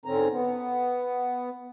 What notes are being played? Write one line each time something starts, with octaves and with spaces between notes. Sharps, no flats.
G#2 D3 C4 C#4 A#5
B3